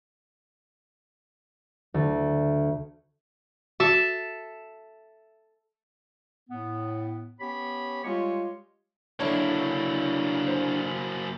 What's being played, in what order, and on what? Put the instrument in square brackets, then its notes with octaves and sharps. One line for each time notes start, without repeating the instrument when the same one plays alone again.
[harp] D2
[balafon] F#4 [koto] A4 E5 A5
[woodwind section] A2 B3
B3 C#4 G4 C#5 B5
G3 G#3 F4 G4 C#5
[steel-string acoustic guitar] D3 D4 E4 [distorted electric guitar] F#3 A#3 [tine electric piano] C#5
[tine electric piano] C5